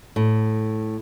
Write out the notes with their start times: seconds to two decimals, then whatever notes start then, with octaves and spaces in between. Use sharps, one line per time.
0.16 A2